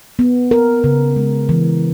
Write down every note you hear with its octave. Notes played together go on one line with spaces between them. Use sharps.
B3
A#4
C#3
G#3
E3